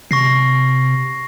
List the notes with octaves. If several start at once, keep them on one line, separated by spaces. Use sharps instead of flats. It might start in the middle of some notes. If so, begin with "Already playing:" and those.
C3 C#6 A#6 C7